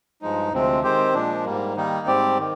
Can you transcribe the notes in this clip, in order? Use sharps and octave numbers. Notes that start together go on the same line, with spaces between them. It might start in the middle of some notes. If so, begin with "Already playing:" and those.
G2 F3 G#3 D#4
D2 C3 F3 G#3 C4
D#3 G#3 C4 G4 C5
A#2 F3 G#3 D4
G#2 G3 A#3
D#3 G3 A#3 D#4
G#2 G3 C4 G4 D5
D#3